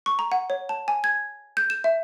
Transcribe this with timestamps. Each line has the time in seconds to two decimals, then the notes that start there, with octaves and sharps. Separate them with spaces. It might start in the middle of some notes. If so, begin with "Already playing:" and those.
0.06 C#6
0.19 A#5
0.32 F#5
0.50 C#5
0.69 A5
0.88 G#5
1.04 G#6
1.57 G6
1.70 E7
1.84 E5